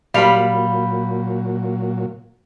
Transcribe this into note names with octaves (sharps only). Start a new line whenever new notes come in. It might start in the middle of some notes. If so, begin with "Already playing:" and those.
A#2 F#3 G3 F5 B5